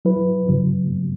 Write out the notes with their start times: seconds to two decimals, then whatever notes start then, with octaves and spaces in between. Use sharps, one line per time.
0.05 F#3 E4 B4
0.48 F#2 C#3 F#3